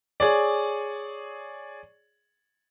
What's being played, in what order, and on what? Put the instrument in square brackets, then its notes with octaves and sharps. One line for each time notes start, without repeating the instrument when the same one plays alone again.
[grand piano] G#4 C#5 D5